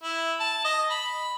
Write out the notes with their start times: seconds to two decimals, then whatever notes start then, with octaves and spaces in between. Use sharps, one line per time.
0.03 E4
0.40 A5
0.64 D#5
0.90 B5